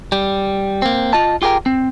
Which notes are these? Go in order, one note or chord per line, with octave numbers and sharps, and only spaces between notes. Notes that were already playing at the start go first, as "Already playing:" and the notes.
G3
A#3 C4
F4 D#5 A5
F4 G4 G#4 A#4 G5
C4